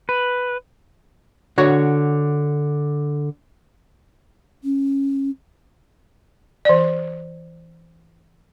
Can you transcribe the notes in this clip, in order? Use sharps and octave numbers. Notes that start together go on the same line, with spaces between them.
B4
D3 F#4 C#5
C#4
E3 D5